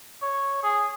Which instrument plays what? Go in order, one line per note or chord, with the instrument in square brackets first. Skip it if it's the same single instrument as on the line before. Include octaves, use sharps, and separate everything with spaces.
[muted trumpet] C#5
G#4